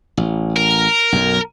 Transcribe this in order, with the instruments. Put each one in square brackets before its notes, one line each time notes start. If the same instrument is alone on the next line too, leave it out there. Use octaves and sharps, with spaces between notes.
[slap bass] A1
[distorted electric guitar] A#4
[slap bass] B1 F#2